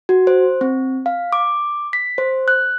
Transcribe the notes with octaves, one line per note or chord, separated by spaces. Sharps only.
F#4
C5
C4
F5
D6
B6
C5
F#6